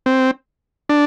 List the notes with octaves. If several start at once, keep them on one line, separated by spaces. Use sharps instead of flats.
C4
D4